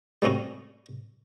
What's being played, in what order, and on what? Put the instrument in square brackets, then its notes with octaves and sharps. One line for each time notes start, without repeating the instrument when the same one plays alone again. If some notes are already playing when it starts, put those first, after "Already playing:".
[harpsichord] G3 A3 C4 C#4 F#4